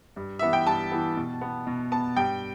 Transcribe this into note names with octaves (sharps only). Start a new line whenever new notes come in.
G2
E3 B3 E5
G5
G2 A5
E3 B3
B2
B3
B2
B3 A5
G2 G5